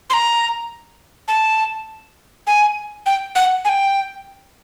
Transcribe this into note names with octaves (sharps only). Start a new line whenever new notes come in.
C6
A#5
A5
G#5
G5
F#5
G#5
G5